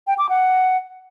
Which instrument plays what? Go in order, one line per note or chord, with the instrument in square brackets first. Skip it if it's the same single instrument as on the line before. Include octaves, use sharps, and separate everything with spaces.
[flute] G5
D6
F#5